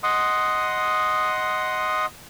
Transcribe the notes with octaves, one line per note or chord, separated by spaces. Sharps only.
D#5 F#5 C6 D#6